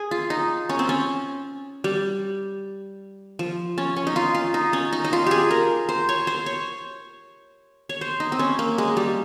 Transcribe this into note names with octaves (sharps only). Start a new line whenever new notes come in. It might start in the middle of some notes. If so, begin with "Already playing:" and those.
Already playing: G#4
F4
D#4
C#4
C4
C#4
G3
F3
C#4
C#4
D#4
F4
F4
D#4
C#4
D#4
D#4
F4
G4 G#4
A#4
C5
C#5
C5
C#5
C#5
C5
D#4
C4
C#4
A#3
G#3
G3